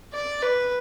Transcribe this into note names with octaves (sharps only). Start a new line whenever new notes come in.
D5
B4